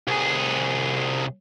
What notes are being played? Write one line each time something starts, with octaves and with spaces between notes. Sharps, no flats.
C2 G#4